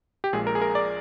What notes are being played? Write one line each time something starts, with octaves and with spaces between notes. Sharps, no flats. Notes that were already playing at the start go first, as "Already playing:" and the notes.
G4
A#1 A#2 G#3 G#4
A#4
G#4
A#4
D5